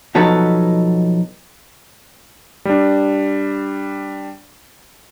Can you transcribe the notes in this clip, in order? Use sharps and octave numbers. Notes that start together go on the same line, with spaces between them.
B2 F3 F#3 B3 D#4 A4
G3 D4